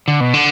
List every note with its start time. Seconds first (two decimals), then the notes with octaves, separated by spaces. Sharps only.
0.08 D3
0.20 B2
0.34 D3